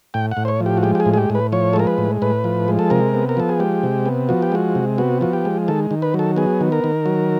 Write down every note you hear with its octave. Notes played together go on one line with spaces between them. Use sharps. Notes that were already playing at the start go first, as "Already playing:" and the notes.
A2 G5
F#5
A2
C5
C#5
F3
G4
F#4
G#3 G4
G4
G#4
A2
G#4
G4
A2
B4
F3 C#5
A4
G#3 A#4
B4
A2
A2 B4
F3
G#3
A4
C3 A#4
B3
A#4
F3 A4
G#4
G#3 G4
C3
B3
F3 F#4
G4
G#3 F#4
C3
B3 F#4
F3 F#4
G4
G#3
D#3 A4
D#3
B4
F#3
A4
B3 G#4
D#3
A#4
D#3
F#3